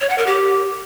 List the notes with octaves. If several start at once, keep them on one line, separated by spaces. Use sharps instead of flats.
C#5
F#5
A#4
G4